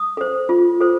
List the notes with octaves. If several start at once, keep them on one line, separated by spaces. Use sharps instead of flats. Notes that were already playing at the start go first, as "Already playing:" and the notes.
Already playing: D#6
A4 C5
F4
A4 C5